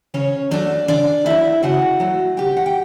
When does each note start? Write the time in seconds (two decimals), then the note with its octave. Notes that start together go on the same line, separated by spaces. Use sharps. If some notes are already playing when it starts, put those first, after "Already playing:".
0.14 C#3 C#4 C#5
0.51 F#3 A3 D4 D5
0.88 C#3 D4 D5
1.26 F#3 A3 E4 E5
1.63 C#3 F#4 F#5
2.00 F#3 A3
2.37 C#3 G4 G5
2.57 F#5
2.66 G5